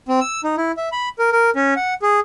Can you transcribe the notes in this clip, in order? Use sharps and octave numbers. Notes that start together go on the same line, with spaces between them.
C4
E6
D#4
E4
E5
B5
A#4
A#4
C#4
F#5
G#4